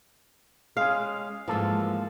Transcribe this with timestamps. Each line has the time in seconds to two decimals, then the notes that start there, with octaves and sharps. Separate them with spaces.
0.77 G#3 C#4 F5
1.48 G#2 E3 F3 A#3 A4